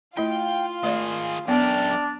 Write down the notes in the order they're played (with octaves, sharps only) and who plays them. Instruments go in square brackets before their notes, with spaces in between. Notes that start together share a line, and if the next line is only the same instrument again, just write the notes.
[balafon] A3 E4 [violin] F4 F5 [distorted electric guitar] G5
[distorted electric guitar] D#3 G#4 [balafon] A3 D5
[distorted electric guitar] F#2 G4 [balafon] B3 [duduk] D4 [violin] D5 F6